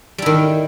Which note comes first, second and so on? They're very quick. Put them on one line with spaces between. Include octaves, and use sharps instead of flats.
G3 E4 D#3